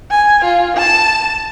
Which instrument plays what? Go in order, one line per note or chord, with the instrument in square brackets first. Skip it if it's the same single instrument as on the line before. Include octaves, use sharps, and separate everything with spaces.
[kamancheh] G#5
F4
A5